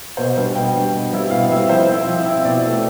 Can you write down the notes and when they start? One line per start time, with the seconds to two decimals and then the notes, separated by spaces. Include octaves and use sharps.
0.17 B2 C5
0.37 G3 D4 C5
0.55 B2 G5
0.74 G3 D4
0.94 B2
1.13 G3 C4 E4
1.31 B2 F5
1.50 G3 C4 E4 E5
1.70 F3 C5
1.88 C4 E4
2.07 F3
2.26 C4 E4
2.45 B2 D5
2.64 A3 C4